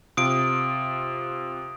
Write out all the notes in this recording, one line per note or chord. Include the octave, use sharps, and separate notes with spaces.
C3 F4 D#6 D7